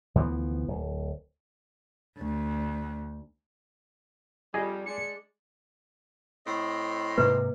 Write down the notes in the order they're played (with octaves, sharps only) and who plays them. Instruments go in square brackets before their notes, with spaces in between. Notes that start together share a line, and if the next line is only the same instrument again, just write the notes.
[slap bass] D2 E3 F3 B3
D1
[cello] D2
[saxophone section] F2 G3 [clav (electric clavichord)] G#4 D#5
[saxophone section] G#3 D4 [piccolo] C#7
[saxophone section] A2 C4 D#5
[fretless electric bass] G#2 C3 A#3 [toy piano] B4